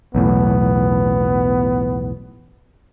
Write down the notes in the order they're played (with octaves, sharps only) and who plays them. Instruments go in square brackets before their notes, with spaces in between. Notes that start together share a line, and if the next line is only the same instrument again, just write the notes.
[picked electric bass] B1 E2 A2 [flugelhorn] B3